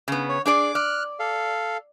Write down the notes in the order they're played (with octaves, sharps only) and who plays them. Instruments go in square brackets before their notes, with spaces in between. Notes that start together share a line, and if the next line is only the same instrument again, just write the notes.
[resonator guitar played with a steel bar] C#3 B3
[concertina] C#5
[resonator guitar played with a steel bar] D4 G#4 D5 [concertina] D6
[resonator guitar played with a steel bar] D5 [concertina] F6 F#6
[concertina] A4 F5